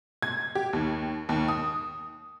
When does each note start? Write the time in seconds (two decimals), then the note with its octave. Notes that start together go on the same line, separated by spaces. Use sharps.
0.22 G#6
0.55 G4
0.73 D#2
1.29 D#2
1.48 D#6